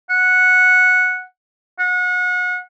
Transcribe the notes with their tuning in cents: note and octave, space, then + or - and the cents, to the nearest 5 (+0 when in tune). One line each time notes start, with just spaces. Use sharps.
F#5 -10
F#5 -35